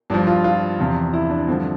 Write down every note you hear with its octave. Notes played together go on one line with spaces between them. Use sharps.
G2 F3 D4
F4
F4
E2 C3 F3
E4
D4
G2 D3 F3 C4